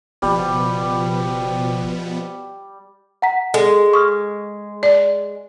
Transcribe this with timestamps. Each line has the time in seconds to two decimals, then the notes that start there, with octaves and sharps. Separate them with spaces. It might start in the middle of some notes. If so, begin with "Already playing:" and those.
0.22 F#1 B2 F3 G3 B3
3.22 F#5 A#5 B6
3.54 G#3 A4
3.94 C#6 D#6 F6
4.83 D5